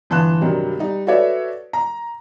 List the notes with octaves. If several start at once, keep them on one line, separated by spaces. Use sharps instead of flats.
G1 E3 A5 C6 F#6 E7
G2 C3 D#3 F#3
G3 D#4
F#4 A4 B4 C#5 D5 E5
A#5